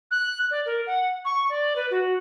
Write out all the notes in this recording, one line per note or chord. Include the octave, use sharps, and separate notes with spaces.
F#6
D5
A#4
F#5
C#6
D5
B4
F#4